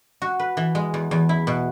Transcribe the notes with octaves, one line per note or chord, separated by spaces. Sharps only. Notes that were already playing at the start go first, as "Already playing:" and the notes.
F#4
B4
E3
G#3
E2
E2
E4
B2